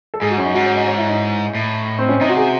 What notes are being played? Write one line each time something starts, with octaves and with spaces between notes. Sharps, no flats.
A4
G#2 G#4
F#4
F#2 C#4
D#4
G#2 F#4
C#5
D#5
C#5
E4
D#4
A2
C4
C#4
C3 D#4
F#4
G#4